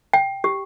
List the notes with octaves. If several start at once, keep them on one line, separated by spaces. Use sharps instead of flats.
G5
G4